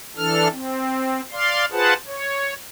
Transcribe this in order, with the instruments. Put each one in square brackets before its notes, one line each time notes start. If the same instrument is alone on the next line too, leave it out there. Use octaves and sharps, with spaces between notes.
[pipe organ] E3 D4 A4 F6
C4
D5 F5 C6
F4 G#4 B4 C5 F#5 A5
C#5